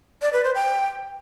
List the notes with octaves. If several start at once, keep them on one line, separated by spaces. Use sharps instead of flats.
D5
B4
C5
G5